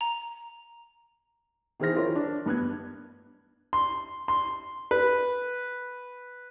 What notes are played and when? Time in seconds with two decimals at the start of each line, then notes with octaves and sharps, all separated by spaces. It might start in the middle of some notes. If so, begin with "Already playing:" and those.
0.01 A#5
1.80 D#3 E3 G#4 C5 F6 A#6
1.95 E4 F4 A#4 C#5
2.15 D4
2.46 G2 B3 F#6 G#6
3.73 C6
4.28 C6
4.91 B4